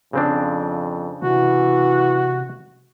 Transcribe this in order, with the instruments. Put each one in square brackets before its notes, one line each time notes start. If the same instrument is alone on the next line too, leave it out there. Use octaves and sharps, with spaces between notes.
[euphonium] F2 [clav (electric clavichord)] C#3 C4 D4
[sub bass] C3 [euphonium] E3 [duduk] F#4